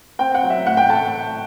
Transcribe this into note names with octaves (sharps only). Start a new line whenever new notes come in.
C4 G5
F#5
F#3
E5
A2 F#5
G5
A3 A5